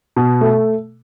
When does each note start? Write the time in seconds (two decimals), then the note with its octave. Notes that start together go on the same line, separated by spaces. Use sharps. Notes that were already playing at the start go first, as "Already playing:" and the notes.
0.16 B2
0.41 A3